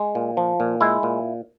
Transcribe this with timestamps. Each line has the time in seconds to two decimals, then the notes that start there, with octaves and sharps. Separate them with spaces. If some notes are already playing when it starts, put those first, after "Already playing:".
Already playing: G#3
0.15 A#2
0.37 F3
0.60 A#2
0.81 G#3 E4
1.03 A#2